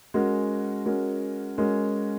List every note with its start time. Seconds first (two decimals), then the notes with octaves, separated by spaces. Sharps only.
0.14 G#3 C#4 F#4 A#4
0.85 G#3 C#4 F#4 A#4
1.58 G#3 C#4 F#4 A#4